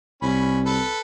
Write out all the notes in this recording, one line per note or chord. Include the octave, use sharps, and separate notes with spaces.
C2 C#4 B5
A4 B4